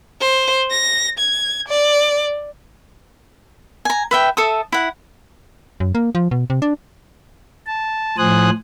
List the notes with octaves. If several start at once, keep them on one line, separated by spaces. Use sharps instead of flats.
C5
A#6
G#6
D5
G#5 A#5
B4 E5 G5
A4 E5 D#6
E4 F#5
F#2
A#3
F3
B2
C3
D4
A5
A2 F3 C5 G#5 D#6 F#6